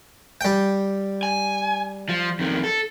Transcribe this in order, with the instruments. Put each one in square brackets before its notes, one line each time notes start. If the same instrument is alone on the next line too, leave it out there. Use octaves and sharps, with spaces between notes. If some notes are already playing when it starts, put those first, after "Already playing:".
[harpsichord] G3 G5
[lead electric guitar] G#5
F3
F2 D#3
A4